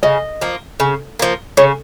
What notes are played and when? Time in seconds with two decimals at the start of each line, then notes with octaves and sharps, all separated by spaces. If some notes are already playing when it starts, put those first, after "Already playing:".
0.03 C#3 D#5
0.41 F3 A#3
0.80 C#3
1.19 F3 A#3
1.57 C#3 C#5